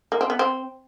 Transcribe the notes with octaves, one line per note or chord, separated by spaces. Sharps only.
A#3
C4
B3
C4